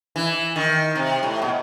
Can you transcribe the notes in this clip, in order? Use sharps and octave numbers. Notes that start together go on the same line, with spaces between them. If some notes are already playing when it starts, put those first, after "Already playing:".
E3
D#3
C3
A2
B2